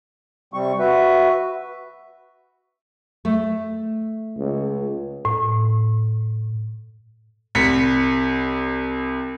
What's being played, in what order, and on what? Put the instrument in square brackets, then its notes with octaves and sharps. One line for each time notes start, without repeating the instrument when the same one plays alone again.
[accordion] C3 G3 C4 C#6
F#4 B4 E5
[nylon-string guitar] A3
[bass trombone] C#2
[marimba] A2
[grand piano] C2 B6 C#7